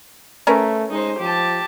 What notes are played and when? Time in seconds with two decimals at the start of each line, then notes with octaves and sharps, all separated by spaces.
0.47 A3 C#4 A#4 B4
0.91 G#3 D#4 C5
1.19 F3 G4 A5